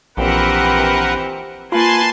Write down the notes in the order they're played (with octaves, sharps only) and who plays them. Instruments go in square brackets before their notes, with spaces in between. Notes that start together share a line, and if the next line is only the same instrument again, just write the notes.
[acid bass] A#1 [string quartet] E3 C4 G4 [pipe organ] A#4 B4 F#5
[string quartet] A#3 B4 [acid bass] F4 [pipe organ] G#5 A5 C6